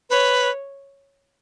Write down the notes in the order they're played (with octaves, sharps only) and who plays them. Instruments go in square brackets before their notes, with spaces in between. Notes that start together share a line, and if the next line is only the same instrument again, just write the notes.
[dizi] B4 [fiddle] C#5